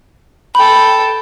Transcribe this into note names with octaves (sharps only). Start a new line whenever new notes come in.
A4 G5 B5